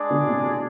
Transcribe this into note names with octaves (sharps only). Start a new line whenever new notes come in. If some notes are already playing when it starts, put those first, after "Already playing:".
Already playing: G#3 D4 G#4 D5
B2 D3
A2 C3
B2